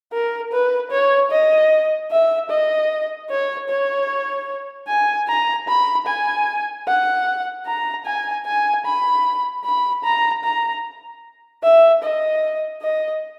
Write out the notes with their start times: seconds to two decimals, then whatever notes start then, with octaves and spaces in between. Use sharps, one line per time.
0.13 A#4
0.53 B4
0.91 C#5
1.31 D#5
2.11 E5
2.50 D#5
3.30 C#5
3.69 C#5
4.88 G#5
5.28 A#5
5.68 B5
6.07 G#5
6.87 F#5
7.67 A#5
8.06 G#5
8.46 G#5
8.86 B5
9.65 B5
10.04 A#5
10.44 A#5
11.63 E5
12.03 D#5
12.82 D#5